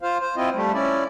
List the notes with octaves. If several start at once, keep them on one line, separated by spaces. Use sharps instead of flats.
F4 C5 F5
C5
C4 E4 F4 D#5
G3 A3
C#4 E4 D5